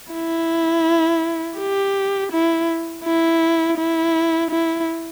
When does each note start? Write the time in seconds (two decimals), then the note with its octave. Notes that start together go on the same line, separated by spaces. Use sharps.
0.13 E4
1.58 G4
2.32 E4
3.04 E4
3.77 E4
4.50 E4